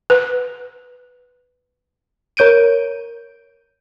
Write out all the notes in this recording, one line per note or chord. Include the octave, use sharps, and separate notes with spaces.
B4
A#4 C#5 G6 D7 D#7